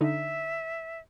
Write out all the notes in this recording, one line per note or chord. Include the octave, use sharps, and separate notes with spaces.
D3 D#4 E5